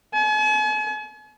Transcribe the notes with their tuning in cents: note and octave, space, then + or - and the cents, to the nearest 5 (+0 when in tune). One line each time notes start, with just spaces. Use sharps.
G#5 +45